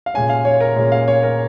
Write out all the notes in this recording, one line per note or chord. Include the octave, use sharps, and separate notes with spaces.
F5
A#2 G#3 C#4 G#5
F5
C#5
A#4
A#2 G#3 C#4
F5
C#5
A#4